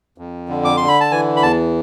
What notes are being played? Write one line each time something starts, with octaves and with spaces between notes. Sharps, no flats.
F2
D3
D6
D3 C6
B5
A5
E3 G#5
B5
E2 A5